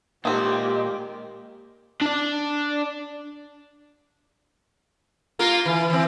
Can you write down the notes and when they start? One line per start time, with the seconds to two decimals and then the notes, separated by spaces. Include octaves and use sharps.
0.25 A#2 D#3 G#3 C4 G4
2.02 D4 D5
5.39 A#3 F4 A#4
5.66 E3
5.90 E3 C4